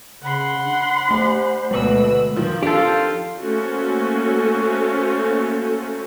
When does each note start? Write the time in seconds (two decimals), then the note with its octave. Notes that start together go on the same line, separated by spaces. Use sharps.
0.22 C#3 F#5 B5 C6
0.64 D4
1.11 A3 G4 C5
1.71 D2 B2 G#3 B4 E6 F#7
2.36 D#3 F3
2.63 C4 D4 F4 G4 A4
3.40 A3 A#3 C#4 F#4 A4 C5